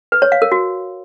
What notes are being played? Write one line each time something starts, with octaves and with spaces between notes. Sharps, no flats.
B4
C#5
F5
A#4
F#4